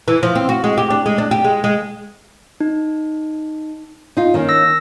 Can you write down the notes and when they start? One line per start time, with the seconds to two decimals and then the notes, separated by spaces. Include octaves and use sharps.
0.08 E3
0.23 F3
0.35 C4
0.49 F#4
0.64 G#3
0.78 G4
0.90 D4
1.06 G#3
1.18 D4
1.31 G4
1.44 G#3
1.64 G#3
2.61 D#4
4.17 D#4 F4
4.34 D#3 A#3 C#4
4.49 E6 A#6